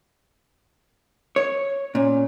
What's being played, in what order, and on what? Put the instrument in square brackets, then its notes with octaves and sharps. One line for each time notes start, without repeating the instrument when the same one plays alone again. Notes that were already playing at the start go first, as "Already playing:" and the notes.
[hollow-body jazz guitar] C#5
[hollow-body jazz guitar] A#2 [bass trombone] C#4